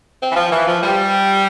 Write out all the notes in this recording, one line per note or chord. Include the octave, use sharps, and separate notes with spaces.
C4
E3
F3
E3
F3
G3